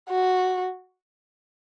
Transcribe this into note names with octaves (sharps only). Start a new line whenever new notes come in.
F#4